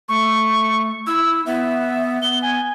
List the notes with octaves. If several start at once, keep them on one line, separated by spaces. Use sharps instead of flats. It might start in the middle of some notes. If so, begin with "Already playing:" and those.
A3 C#6
E4 E6
B3 E5
B3 G7
G#5